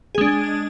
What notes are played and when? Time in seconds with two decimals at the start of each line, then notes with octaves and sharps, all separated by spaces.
0.15 G#4
0.18 G#3
0.21 D4